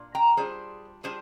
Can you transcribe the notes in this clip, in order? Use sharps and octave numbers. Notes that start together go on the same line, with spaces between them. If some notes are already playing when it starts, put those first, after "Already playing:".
Already playing: A#2 D4 F4
G5 A#5
G3 D4 F4 G#4 C5
G3 D4 F4 G#4 C5